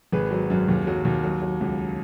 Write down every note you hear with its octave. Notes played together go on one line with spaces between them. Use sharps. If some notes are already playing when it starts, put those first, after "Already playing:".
G#1 G#4 B4
F#3
F#2
D#2
F#3
D#2
F#3
F#3
C#2